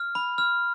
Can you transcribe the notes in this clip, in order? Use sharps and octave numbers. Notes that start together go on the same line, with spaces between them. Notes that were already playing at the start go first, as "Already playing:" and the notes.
Already playing: F6
B5
F6